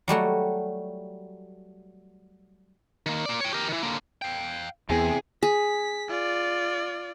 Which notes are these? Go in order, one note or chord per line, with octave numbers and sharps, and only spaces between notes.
F#3 G3 A3 F#4
D#3 A#3
A#3 D5
C#5 G5
G4 A#4
D#3 E3
D3 A#3
F5 G5
E2 C3 E3 B3 G#4
G#4 B6
F4 D5